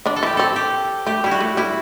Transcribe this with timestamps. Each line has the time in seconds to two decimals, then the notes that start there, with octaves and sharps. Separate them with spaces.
0.06 D3 D4
0.16 A4
0.23 E3 E4 G4
0.37 C4 A4
0.56 G4
1.07 A3 G4
1.24 G3 E4
1.31 F#4
1.40 A3
1.57 G3 E4